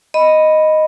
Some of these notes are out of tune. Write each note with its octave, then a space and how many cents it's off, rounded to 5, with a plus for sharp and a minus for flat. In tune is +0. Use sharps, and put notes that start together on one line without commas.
D#5 +0 B5 +0